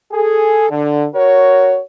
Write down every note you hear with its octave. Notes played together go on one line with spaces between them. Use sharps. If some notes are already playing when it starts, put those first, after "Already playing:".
G#4 A4
D3
F#4 A#4 C#5